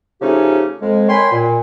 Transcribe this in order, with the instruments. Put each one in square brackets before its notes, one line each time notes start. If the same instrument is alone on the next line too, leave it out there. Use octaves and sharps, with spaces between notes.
[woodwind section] C#3 F3 A3 C#4 D#4 G4
F2 G#3
A#4 C#5 G5 G#5 B5 C6
A#2